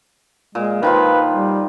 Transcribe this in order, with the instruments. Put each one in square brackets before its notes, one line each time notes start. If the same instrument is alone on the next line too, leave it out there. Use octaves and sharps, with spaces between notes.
[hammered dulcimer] A#2 [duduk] G#3
[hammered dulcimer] D#3 F3 F4 [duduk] B4
[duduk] G3